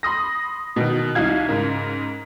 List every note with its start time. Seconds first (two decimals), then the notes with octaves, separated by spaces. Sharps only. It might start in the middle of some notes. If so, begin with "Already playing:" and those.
0.03 B5 C6 D#6 A#6
0.76 B2 D#3
1.15 C2 D#4 F#4 F5 G#6
1.49 G#2 C#3 A#4